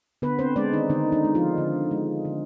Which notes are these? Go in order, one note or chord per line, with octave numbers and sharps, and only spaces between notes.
D3 B3 B4
C4 C5
G#3 D4 D5
D#3 D#4
D3 D#3 D#4
D#3 D#4
G#3
F3 F4
D3
G#3
D3